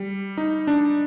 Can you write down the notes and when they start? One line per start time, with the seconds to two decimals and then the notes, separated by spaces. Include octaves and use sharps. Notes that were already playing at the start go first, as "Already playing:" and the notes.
Already playing: G3
0.37 D#4
0.67 D4